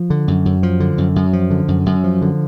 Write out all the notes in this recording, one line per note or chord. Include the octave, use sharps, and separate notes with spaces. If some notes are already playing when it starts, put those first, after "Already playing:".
Already playing: F3
D3
F#2
F#2
F3
D3
F#2
F#2
F3
D3
F#2
F#2
F3
D3